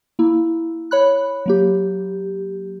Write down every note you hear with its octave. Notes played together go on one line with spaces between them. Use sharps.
A#3 E4
C#5 B5 F#6
F#3 A#3 G4